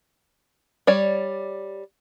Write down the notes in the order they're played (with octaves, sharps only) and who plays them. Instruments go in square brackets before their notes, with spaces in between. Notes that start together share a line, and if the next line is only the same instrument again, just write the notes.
[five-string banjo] G3 C#5 D5